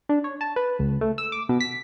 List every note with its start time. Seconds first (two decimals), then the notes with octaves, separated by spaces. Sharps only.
0.09 D4
0.24 C#5
0.41 A5
0.56 B4
0.79 C#2
1.01 A3
1.18 E6
1.32 D6
1.49 B2
1.60 B6